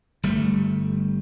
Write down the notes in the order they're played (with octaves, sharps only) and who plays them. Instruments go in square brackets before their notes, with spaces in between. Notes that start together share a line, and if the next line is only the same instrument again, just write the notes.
[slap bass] G1 G3 A3